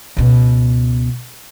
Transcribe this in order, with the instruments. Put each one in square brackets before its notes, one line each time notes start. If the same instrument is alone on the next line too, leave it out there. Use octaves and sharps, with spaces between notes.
[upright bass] C#2 B2